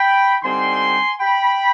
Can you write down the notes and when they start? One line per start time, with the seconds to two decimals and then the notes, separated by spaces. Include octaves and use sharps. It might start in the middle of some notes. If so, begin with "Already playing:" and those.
Already playing: G5 B5
0.42 D3 G3 C4 D#4 G#5 C6
1.20 G5 B5